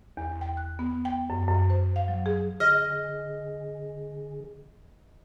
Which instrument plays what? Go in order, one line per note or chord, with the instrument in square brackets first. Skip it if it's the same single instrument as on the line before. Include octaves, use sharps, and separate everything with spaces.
[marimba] E2
G5
F#6
B3
G5
F#2
F#2
C5
F5
F#3
G#4
[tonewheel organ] D3 G#4 [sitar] D#5 [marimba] F6